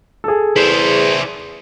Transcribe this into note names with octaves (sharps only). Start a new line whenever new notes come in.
G#4 A4
E2 E4 C5